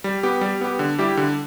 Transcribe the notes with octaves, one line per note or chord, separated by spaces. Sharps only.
G3
B3 G4
G3
B3 G4
D3
G3 E4 G4
D3